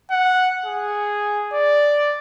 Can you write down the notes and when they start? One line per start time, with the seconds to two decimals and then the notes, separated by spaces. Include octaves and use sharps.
0.11 F#5
0.66 G#4
1.53 D5